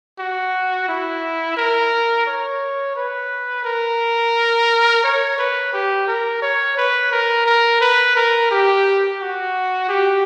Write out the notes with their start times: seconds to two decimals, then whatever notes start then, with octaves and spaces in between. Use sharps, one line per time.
0.19 F#4
0.89 E4
1.57 A#4
2.26 C#5
2.96 B4
3.65 A#4
5.04 C#5
5.38 B4
5.73 G4
6.08 A#4
6.42 C#5
6.77 B4
7.12 A#4
7.46 A#4
7.81 B4
8.16 A#4
8.51 G4
9.20 F#4
9.89 G4